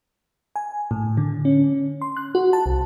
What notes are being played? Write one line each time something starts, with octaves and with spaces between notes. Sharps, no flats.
G#5
A2
D3
C#4
C6
F#6
F#4
A5
C2